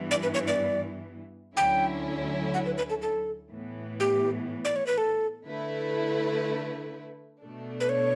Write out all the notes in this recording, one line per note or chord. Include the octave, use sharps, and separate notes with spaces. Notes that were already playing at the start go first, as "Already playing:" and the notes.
Already playing: G2 E3 B3
D5
B4
C#5
D5
D2 D3 F#3 C#4 E4 G5
F#5
B4
B4
A4
A4
A2 E3 B3
G4
D5
C#5
B4
A4
D3 A3 E4 B4
B2 A3 D4
B4
C#5